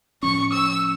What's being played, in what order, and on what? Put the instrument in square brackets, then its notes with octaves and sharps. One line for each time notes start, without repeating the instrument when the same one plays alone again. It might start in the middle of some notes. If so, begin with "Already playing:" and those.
[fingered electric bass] A2 F3 C#4 [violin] C#6
[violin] E6